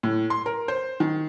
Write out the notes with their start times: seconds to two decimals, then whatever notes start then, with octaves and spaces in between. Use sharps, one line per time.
0.03 A2
0.30 C6
0.46 A#4
0.68 C5
1.00 D#3